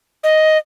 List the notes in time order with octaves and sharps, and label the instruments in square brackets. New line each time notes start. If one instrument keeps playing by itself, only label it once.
[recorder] D#5